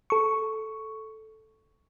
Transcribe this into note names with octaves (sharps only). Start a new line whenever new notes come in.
A4 C#6